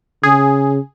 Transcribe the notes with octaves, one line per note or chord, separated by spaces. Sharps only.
C#3 G#4